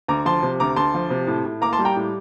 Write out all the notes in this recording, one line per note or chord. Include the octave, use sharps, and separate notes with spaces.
D2 A#5 D6
F3 A5 C6
C3
D2 A#5 D6
D2 A5 C6
F3
C3
A2
A2
A#3 A#5 D6
A5 C6
G3
G5 A#5
A2